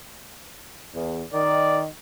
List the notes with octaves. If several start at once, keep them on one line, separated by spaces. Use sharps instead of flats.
E2
D#3 D5